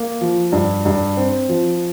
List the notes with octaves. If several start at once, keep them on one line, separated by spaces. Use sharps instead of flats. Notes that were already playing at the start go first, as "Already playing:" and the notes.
Already playing: A#3
F3
G2
G2
C4
F3